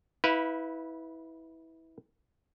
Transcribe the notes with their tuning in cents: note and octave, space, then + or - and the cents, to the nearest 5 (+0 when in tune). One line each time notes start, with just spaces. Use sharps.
E4 -25 B4 +0 F5 +0